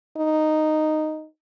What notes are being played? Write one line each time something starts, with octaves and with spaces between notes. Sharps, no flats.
D#4